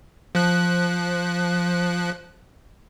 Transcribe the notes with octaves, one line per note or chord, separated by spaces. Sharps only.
F3 F#6